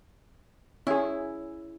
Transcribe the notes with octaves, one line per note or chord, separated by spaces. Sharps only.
C#4 E4 G#4